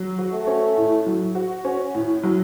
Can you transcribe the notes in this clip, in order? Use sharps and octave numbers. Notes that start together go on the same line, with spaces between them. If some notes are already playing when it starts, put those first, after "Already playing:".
Already playing: F#3
F#4
A3
C#4
A2
F#3
F#4
C#4
A2
F#3